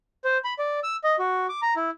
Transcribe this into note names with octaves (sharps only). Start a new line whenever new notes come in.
C5
B5
D5
E6
D#5
F#4
D6
A#5
E4